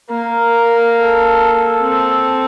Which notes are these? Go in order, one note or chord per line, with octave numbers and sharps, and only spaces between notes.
A#3 A#4
A4
C4